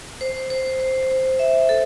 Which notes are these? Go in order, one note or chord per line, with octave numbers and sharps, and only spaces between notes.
C5
C5
C5
C5
E5
A4